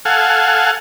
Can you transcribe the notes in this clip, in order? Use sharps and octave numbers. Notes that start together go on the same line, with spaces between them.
A4 F5 F#5 G#5